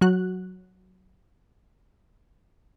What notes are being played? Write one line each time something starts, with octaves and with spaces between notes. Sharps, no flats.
F#3 F#4 F#6